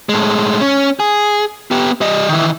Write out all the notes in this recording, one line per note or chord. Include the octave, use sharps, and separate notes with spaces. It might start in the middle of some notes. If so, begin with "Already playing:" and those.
A2 G#3
C#4
G#4
B3 G4
G3 D#5
D#3 E3